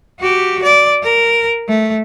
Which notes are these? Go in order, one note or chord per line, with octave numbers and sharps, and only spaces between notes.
F#4 G4
D5
A#4
A3